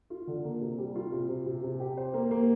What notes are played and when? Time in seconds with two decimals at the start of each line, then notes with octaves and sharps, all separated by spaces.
0.10 F4
0.27 D3
0.44 A#3
0.61 C3
0.78 G3
0.95 F4
1.12 C3
1.29 C3
1.46 C3
1.63 C3
1.80 G4
1.97 C5
2.14 A#3
2.31 A#3